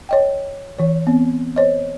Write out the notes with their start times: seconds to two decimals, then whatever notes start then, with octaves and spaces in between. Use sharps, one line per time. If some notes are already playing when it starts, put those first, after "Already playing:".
0.09 C#5 D#5 G5
0.78 E3 C#5
1.07 B3 C4
1.56 C5 C#5 D#5